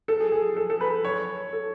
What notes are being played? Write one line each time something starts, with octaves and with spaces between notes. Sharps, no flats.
A4
G#4
G#4
A4
A4
B4
C#5
A4